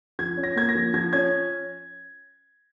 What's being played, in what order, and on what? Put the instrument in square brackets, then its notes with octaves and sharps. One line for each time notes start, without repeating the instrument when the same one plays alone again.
[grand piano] F3 G#6
C#4
A#6
A#3 G#6
A#6
F3
F3 G#6
C#4 G#6